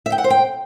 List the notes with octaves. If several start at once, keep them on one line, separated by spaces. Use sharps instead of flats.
E5
G5
F#5
C5
G5